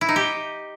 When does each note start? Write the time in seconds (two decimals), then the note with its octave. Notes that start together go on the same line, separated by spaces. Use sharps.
0.01 E4
0.09 D#4
0.16 G4